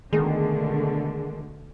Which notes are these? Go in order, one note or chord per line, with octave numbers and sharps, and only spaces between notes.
B2 D3 D#3 G#3 A3